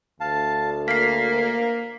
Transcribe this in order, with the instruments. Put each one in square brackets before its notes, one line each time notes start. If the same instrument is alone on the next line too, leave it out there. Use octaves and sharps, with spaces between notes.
[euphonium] D2 [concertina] F5 A5
[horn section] A#3 [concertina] F6 [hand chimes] B6 C7